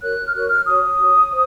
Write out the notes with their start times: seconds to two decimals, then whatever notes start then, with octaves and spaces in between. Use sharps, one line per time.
0.03 F#4 A#4 C#5 F#6
0.27 F6
0.34 F#4 A#4 C#5 F#6
0.51 F6
0.67 F#4 C#5 D#6
0.99 F#4 C#5
1.31 C5